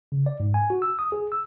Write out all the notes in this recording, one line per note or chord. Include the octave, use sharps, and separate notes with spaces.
C#3
D5
G#2
G#5
F#4
E6
D#6
G#4
E6